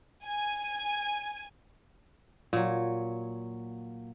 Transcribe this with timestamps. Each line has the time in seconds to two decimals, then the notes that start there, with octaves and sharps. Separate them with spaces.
0.24 G#5
2.53 A#2 F#3